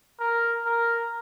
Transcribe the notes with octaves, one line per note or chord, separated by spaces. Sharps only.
A#4
A#4